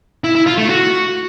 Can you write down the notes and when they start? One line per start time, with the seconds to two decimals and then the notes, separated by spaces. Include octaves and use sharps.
0.24 E4
0.35 E4
0.47 F4
0.58 A3
0.69 F#4